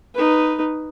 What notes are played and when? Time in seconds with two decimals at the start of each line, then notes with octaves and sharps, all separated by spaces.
0.15 D#4 B4